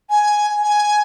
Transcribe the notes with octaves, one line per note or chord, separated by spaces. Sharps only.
G#5
G#5